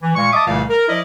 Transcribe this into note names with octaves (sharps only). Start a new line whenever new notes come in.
E3
A#2 G#3 F5 C#6
D#5 E5 A5 D6 D#6
C2 A#2 C#3 E3 A3 F5
A#4
F3 E4 D5 D#5